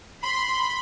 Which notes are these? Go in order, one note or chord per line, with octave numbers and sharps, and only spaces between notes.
B5 C6